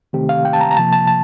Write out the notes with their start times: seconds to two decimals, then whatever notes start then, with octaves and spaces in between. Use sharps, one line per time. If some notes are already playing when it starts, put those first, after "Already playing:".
0.13 C3 D#3 A3 C4 G4
0.29 F5
0.45 G5
0.53 A5
0.61 A#5
0.71 A#5
0.77 C3 F3 A#3 A5
0.93 A5
1.07 A5